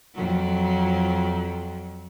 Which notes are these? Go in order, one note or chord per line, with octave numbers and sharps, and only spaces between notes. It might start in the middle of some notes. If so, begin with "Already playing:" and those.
F2 F#3